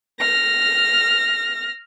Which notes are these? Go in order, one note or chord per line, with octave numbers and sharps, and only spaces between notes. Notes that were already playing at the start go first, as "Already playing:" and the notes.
F6 A#6